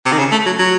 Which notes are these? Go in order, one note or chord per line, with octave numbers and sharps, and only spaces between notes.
C3
D#3
C#3
A3
F#3
F#3